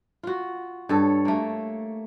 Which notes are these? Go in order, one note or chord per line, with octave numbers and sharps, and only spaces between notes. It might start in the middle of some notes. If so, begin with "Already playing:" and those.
F4 F#4
G2 A4 C#5
A3 A#3